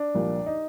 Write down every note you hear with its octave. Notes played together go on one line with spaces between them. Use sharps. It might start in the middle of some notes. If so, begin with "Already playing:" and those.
Already playing: D4
C2 A#2 F3
D#4